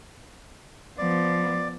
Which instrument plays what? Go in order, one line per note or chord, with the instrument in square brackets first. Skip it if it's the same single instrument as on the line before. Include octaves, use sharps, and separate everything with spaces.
[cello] F3 B3 [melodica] D5